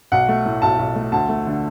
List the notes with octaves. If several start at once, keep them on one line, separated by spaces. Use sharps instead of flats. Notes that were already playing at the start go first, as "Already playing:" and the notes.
B1 F#5
A3
A2
B1 A5
B1
A3
D2 A5
A3
D3